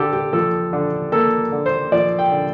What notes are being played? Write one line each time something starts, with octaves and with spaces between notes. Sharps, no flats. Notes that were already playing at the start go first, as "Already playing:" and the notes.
Already playing: D3 G4 A4
G4
F3 A4
D3
A#3 A4
D3
C5
F3 D5
G5
D3